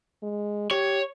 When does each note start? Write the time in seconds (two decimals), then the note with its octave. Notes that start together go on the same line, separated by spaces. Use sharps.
0.23 G#3
0.71 G4 C#5